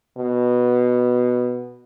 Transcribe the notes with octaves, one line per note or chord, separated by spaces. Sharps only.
B2